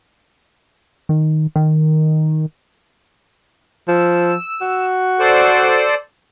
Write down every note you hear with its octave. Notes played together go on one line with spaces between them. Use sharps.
D#3
D#3
F3 E6
F#4
A4 C5 D5